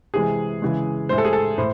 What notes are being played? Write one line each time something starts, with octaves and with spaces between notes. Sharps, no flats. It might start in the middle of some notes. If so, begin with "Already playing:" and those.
C3 E3 G#3 G#4
C#3 E3 G#3
A2 G#3 C5
A4
G#4
A4
A2 C5